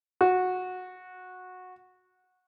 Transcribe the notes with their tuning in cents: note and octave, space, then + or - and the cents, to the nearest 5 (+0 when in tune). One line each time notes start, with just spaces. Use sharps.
F#4 -15